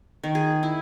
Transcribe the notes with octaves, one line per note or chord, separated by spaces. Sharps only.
D#3
G#4
E4